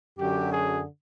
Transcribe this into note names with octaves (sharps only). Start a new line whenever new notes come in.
F#2 D3 F#3 G4
G#4